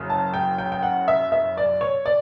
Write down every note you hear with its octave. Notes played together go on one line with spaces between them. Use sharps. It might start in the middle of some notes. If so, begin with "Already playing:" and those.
Already playing: F#1 F#2 C#3
A5
G5
G5
G5
F#5
E5
E5
D5
C#5
D5